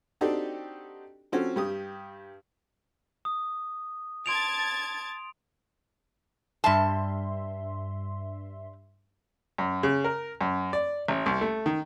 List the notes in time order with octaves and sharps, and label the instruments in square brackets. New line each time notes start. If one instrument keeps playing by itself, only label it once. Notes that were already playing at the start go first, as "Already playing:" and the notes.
[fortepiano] C4 D4 D#4 F#4 G4 A4
F3 C4 C#4 F#4 A4
G2 G4 D#6
[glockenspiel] D#6
[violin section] A5 G#6 A6 [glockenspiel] C6 D7 F7
[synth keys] G2 E5 C6 [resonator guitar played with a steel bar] G3 A5
[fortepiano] F#2
C#3
A#4
F#2
D5
A1
C2
A3
D#3